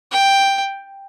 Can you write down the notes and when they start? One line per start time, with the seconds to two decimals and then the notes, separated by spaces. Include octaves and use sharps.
0.11 G5